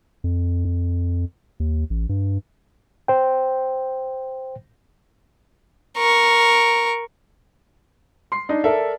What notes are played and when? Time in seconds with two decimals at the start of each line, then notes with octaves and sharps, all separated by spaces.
0.24 F2
0.65 F2
1.60 D#2
1.90 A1
2.09 G2
3.08 C5 G5
5.98 A#4 C#6
8.32 C6 C7
8.49 D4 D#4
8.64 A4 A#4 D5 E5